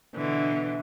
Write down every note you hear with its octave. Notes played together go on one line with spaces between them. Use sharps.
B2 D3 E3